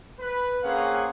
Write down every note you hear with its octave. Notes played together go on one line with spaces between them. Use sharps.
B4
A#3 C4 C#4 G#4 F5 F#5